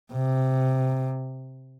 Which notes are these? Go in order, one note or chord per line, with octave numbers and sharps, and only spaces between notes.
C3